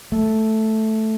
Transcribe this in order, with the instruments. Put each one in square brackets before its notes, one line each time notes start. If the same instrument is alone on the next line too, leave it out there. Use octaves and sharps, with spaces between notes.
[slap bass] A3